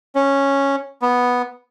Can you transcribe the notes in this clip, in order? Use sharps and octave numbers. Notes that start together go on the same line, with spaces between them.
C#4
B3